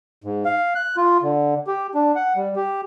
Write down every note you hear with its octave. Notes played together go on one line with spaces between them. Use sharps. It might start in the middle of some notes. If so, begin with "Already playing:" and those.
G#2
F5
F#6
F4
D3
G4
D4
F#5
G3
G4